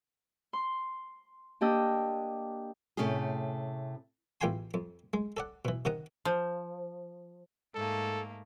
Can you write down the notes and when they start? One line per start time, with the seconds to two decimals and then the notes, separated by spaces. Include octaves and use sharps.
0.53 C6
1.61 A#3 D4 G4 D#5 E6
2.97 A2 C3 A3 C#4 G4 G#4
4.41 A1 E2 F4 G5 G#5 C6
4.74 F2
5.14 G#3
5.37 A4 D5 F#5
5.65 B2 E3
5.85 C3 D#3 F#5 A#5 D#6
6.25 F3
7.75 G#2 A3 A#3 A4